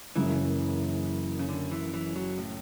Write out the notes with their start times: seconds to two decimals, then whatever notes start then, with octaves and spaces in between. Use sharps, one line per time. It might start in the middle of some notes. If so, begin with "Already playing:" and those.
0.16 F#1 F#2 C#3 E3
1.39 C#3
1.49 D3
1.71 E3
1.93 E3
2.16 F#3
2.38 A2